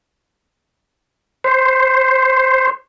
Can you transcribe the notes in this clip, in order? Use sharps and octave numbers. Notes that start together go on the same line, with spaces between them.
C5